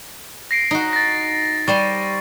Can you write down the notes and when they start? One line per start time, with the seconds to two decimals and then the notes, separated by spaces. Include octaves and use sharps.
0.51 A#6 C7 D7
0.71 D#4 F#4
0.93 A6 A#6
1.68 G3 C5 C6 C#6 A6 D#7